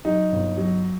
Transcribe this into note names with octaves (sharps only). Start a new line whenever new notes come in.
F#3 D#4
G1
F#3